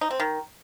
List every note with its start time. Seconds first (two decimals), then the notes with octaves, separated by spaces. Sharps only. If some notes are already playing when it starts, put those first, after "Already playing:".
0.01 D#4
0.11 C4
0.20 D#3